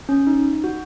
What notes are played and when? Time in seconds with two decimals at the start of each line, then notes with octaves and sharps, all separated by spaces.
0.09 C#4
0.27 D#4
0.64 F#4